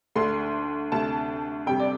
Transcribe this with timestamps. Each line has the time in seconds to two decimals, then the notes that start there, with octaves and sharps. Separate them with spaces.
0.15 D2 D3 A3 C6
0.92 D2 C3 A3 A5
1.67 F2 C3 G3 G5
1.80 D5